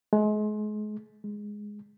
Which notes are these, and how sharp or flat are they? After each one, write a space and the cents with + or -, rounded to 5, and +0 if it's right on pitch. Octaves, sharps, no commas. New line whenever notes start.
G#3 +35
G#3 +0